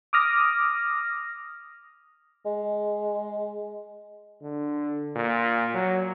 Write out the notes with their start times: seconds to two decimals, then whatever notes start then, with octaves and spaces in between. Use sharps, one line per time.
0.13 D6 D#6 F6 A#6
2.46 G#3
4.42 D3
5.16 A#2
5.74 F#3